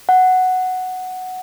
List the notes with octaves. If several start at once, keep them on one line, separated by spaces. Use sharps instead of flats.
F#5